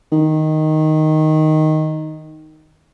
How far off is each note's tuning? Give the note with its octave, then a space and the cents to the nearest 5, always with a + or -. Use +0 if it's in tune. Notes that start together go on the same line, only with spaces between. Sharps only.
D#3 +0